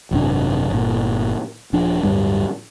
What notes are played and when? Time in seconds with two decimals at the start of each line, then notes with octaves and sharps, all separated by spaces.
0.11 G#1 F#2 C3 D4
0.71 G1 A#2
1.73 D#1 F3 D4
2.03 D1 G1 G2 G3